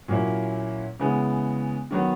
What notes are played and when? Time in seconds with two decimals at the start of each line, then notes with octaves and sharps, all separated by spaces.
0.08 A#2 F#3 A#3 C#4 E4
0.99 C#3 E3 G#3 B3
1.91 D#3 F#3 B3